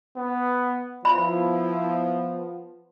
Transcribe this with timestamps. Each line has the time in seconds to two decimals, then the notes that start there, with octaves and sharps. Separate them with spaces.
0.17 B3
1.05 F3 B3 E4 B5